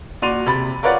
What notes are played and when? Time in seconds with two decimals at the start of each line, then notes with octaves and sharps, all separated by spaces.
0.22 A#2 F#4 D5 C6 D#7 F7
0.46 C3 B5 A6
0.83 F4 A#4 B4 C#5 D5 F#5